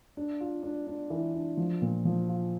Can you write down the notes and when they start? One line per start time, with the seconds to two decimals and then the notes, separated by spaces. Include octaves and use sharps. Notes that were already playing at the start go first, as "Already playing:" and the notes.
0.17 D4
0.40 F4
0.63 D4
0.87 D4
1.10 E3
1.35 D4
1.57 F3
1.82 A#2
2.05 F3
2.29 F4